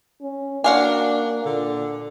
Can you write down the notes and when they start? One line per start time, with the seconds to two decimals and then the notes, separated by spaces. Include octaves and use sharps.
0.22 C#4
0.64 A#3 D4 F#4 F5 G#5
1.45 A#2 D3